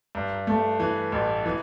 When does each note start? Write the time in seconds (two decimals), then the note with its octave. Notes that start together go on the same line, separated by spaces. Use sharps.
0.15 G2
0.47 A3
0.80 E3
1.12 A1
1.46 E3